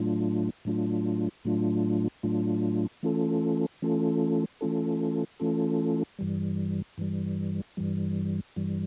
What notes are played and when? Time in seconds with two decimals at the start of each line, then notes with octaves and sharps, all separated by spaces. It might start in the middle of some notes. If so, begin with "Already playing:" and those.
Already playing: A2 F#3 A3 D4 F4
0.65 A2 F#3 A3 D4 F4
1.45 A2 F#3 A3 D4 F4
2.23 A2 F#3 A3 D4 F4
3.03 E3 A3 C#4 F4 A4
3.82 E3 A3 C#4 F4 A4
4.61 E3 A3 C#4 F4 A4
5.40 E3 A3 C#4 F4 A4
6.19 G2 E3 G3
6.98 G2 E3 G3
7.77 G2 E3 G3
8.56 G2 E3 G3